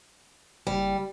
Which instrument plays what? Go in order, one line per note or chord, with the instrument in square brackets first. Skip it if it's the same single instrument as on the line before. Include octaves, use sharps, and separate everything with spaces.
[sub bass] F#1 [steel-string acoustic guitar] G3